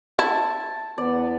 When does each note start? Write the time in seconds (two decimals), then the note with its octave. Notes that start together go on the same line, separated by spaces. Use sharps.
0.19 E4 A5
0.98 E2 B3 D5